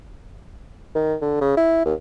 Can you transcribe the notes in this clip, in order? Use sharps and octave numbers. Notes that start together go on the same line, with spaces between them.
D#3
D3
C#3
E4
D#2